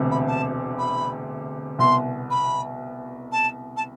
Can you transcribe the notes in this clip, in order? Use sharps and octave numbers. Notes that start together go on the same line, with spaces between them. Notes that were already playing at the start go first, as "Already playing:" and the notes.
Already playing: E1 D2 C3
B5
A5
B5
C2 B2 B3 C6
B5
A5
A5